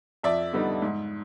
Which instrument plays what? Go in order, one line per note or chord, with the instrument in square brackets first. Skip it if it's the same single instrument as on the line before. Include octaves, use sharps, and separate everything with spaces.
[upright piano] F2 D5 E5
D3 G3 B3 D#4
G#2